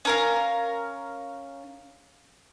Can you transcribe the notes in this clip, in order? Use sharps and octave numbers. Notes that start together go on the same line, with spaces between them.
C#4 A#4 F5